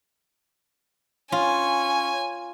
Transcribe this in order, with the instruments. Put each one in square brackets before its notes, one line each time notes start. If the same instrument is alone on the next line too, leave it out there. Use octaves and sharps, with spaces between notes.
[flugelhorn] C#4 [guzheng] F4 [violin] G#5